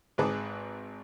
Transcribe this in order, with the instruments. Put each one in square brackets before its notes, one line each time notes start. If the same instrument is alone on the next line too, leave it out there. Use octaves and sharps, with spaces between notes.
[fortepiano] G#1 G#2 G#4 B4 A5 D6